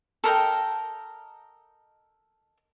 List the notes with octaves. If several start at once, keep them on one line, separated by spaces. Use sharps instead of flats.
A4 A#4 D#5 G5